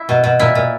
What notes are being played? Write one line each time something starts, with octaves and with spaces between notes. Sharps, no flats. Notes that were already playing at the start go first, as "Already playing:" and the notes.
Already playing: E4
B2
B2
A#2 E4
A#2